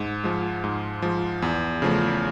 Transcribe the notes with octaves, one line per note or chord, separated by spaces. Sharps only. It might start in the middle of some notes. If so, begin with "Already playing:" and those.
Already playing: G#2
F3 G#3
G#2
F3 G#3
E2
C#3 F3 A3